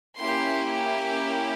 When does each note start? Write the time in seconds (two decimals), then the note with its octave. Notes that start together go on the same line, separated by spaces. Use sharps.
0.18 A#3 C#4 E4 G4 C6